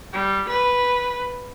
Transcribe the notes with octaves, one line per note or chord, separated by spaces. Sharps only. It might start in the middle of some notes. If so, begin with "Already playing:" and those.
G3
B4